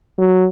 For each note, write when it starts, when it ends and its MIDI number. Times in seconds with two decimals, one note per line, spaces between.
0.19 0.47 54